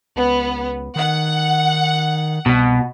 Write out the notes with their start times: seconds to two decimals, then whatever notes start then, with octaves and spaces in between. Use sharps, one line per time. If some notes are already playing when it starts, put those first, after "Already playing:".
0.16 C#2 B3
0.96 D#3 F#5
2.46 C2 B2